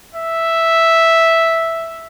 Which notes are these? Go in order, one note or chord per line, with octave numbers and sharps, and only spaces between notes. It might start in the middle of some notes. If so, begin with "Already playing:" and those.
E5